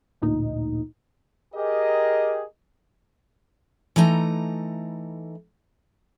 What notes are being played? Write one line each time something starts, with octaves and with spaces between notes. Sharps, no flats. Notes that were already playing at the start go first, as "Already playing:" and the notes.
A1 D2 A#2 D#4
G4 G#4 A#4 D#5
E3 A3 D#4 A#5